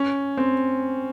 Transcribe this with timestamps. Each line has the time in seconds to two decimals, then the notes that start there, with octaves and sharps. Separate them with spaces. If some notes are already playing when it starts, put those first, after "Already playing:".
Already playing: C#4
0.37 C4